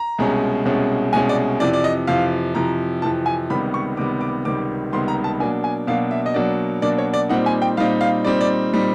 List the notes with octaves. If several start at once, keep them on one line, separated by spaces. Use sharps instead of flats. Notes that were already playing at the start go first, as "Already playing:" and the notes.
Already playing: A#5
C2 B2 G#3 C#4
C2 B2 G#3 C#4
C2 B2 G#3 C#4 G#5
D5
F2 C3 E3 D5
D5
D#5
F2 C3 E3 F5
F2 C3 E3 A#5
F2 C3 E3 A5
G#5
C#2 C3 D#3 G3 B3 B5
C#6
C#2 C3 D#3 G3 B3 D6
D6
C#2 C3 D#3 G3 B3 D6
C#2 C3 D#3 G3 B3 C6
A#5
A5
B2 F#3 A#3 D4 G#5
G#5
B2 F#3 A#3 D4 F5
E5
D#5
B2 F#3 A#3 D4 D5
B2 F#3 A#3 D4 D5
C#5
D5
A#2 G3 C4 D#4 F#5
G#5
G5
A#2 G3 C4 D#4 F5
F5
A#2 G3 C4 D#4 D5
D5
A#2 G3 C4 D#4